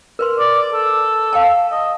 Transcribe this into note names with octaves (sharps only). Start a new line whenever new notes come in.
A#4 B4 C6
D5
A4
F5 G5 A5
D#5